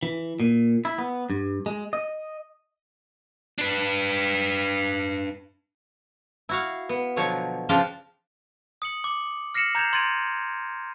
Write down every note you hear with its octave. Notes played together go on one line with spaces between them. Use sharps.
E3
A#2
E4
B3
G2
G#3
D#5
D4 B4
E4 F#4 F5
B3
B2 D3 F3 F#3 C#5
C#3 F3 D4 C5 F5 G5
D#6 C#7 F#7
D6 F#7
F6 A#6 C7 C#7 E7 F#7
A#5 G6 G#6 C7 E7 F7
C6 G#6 A6 D7 D#7 F7